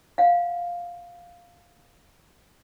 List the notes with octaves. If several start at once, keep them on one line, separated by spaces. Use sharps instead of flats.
F5 F#5